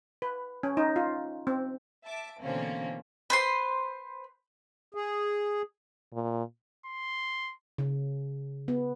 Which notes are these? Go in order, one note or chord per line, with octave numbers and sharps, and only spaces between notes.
B4
C#4
D#4
F4
C4
E5 A5 D6
B2 D3 E3 A#3 C4 C#4
B4 C5 C6
G#4
A#2
C6
C#3
B3